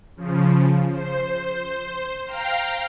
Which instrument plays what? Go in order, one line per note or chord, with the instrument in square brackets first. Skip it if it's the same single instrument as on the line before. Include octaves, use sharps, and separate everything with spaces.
[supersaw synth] C#3 F3
C5
F5 G5 A#5 F6 C7